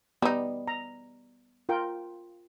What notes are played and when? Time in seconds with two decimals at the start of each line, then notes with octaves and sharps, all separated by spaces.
0.22 G3 B3 D#4
0.68 A#5
1.69 F4 A#4 G5